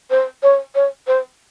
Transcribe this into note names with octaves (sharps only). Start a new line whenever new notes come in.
C5
C#5
C#5
C5